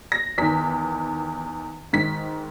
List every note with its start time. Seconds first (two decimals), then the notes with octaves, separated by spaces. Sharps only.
0.12 A#6
0.38 E2 D#3 B6
1.93 G#2 D#3 B6